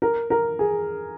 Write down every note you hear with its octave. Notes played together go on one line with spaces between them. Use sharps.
A#4
A#4
G#4